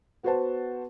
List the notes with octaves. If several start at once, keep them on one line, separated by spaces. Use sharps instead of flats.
B3 F#4 B4 C5 F#5 A5